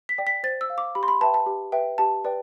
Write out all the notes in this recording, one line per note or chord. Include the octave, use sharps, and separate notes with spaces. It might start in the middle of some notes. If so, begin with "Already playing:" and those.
B6
D5 G5
B6
C5 A6
E6
F5
D6
G4 B5
C6
B5
B4 E5 G5 A5
A5
G4
B4 E5 G5
G4 A5
B4 D5 G5